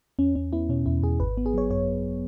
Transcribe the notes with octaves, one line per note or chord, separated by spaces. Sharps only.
E2 C#4
E2 C#4
B3 E4
B2 C#4
E2 E4
E2 G#4
G#1 B4
B3
G#4
F#3 C#5
F#2 C#5